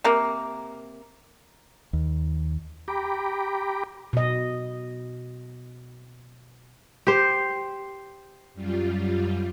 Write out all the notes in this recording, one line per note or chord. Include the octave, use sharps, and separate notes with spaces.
C3 A#3
D#2
G4 G5 A#5 B5 D6
B2 D#5
G4 C5
F#2 G3 F4